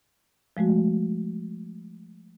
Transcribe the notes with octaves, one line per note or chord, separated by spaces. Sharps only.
F3 G#3 A3 F#4